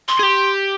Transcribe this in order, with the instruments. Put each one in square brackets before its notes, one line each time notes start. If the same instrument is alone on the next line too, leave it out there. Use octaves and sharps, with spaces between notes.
[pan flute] C6
[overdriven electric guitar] G#4
G4